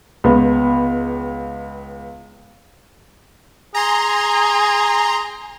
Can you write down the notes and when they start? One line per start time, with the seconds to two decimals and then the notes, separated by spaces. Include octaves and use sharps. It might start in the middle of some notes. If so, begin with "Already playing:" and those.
0.24 C#2 B3
3.74 G#4 G#5 A#5 C6